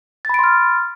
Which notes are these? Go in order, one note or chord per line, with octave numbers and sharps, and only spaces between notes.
B5 C6 F6 A6 D7